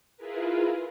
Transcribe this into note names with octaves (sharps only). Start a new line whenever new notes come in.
E4 F4 G#4 A#4 B4